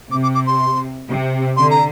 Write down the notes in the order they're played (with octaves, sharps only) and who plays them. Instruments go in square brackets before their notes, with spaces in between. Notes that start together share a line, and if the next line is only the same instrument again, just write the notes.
[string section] C3 [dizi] D6
[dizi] D6
D6
C6
[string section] C3
[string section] D3 [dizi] C6
[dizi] A#5